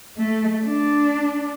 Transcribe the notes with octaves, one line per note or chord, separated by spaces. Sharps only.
A3
D4